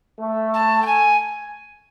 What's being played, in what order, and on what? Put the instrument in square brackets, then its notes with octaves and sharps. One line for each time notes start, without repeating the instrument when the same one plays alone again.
[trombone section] A3
[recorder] A5
G5
G#5